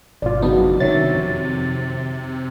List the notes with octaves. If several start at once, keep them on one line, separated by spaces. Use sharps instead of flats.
G#1 F2 B2 F4 D5
C#3 F#3 B3 D4 D#4 F#4
C3 D#3 C#5 E5 A6
F2